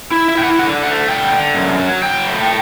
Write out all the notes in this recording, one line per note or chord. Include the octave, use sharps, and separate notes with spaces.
E4
E5
E4 G5
F#5
D3 F#5
A3 F#5
D3 G5
D3
F#2
F#3
F#3 G5
A3